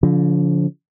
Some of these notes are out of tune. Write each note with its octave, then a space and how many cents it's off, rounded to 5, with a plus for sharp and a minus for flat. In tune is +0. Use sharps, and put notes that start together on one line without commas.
D3 -40 F3 +5